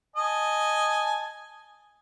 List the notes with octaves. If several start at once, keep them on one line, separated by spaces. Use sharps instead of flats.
D#5 G#5 A5